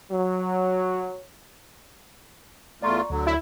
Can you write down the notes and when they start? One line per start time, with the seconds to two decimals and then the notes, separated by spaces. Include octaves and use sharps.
0.11 F#3
2.82 E2 A3 F4 D5 A#5 C#6
3.10 D2 D3 F#3
3.27 E4